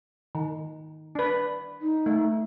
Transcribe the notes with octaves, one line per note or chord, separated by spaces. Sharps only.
D#3
D4 B4
D#4
A3